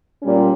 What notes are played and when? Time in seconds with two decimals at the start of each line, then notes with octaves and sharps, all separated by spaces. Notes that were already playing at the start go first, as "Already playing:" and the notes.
0.22 A#2 G3 C#4